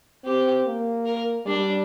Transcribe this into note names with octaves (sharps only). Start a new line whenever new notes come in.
C4 G4
A#3
A#4
G3 D4